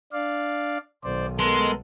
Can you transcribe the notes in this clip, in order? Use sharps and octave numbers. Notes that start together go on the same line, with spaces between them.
D4 D5 F5
B1 D#3 C5 D5
G#3 B3 A4 A#4 C6